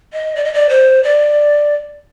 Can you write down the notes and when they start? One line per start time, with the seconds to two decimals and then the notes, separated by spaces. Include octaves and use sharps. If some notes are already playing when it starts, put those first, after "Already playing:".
0.13 D#5
0.36 D5
0.45 D#5
0.54 D5
0.69 C5
1.03 D5